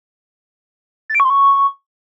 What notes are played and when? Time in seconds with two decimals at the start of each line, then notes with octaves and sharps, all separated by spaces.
1.10 A6
1.15 D7
1.20 C#6
1.25 C6
1.30 C#6